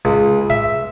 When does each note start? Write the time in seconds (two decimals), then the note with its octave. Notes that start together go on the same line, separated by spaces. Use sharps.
0.05 C#2
0.50 E5